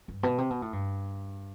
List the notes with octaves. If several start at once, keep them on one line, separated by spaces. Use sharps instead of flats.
G2
B2
C3
B2
A2
G2